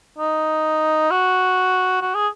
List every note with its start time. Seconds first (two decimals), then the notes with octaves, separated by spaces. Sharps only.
0.19 D#4
1.11 F#4
2.01 F#4
2.15 G#4